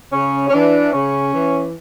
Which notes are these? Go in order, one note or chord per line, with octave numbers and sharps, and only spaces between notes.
C#3 C#4
C#4
E3 D4
C#3 C#4
E3